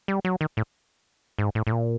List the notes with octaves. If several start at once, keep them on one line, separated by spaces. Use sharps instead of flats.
G3
F#3
D#3
A2
G#2
A2
A2
A#2